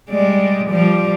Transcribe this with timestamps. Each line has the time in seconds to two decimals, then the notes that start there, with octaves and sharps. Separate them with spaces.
0.10 G3 G#3 D5
0.69 F3 G3 D5